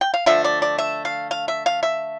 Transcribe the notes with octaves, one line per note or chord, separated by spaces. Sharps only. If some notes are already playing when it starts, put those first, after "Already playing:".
G5
F5
D3 F3 A3 E5
D5
D5
E5
F5
F5
E5
F5
E5